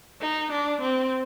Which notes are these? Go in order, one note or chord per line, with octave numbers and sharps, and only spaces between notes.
D#4
D4
C4